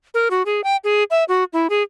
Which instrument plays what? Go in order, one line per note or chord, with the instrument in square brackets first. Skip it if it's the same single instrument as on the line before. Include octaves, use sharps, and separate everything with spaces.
[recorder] A#4
F#4
G#4
G5
G#4
E5
F#4
E4
G#4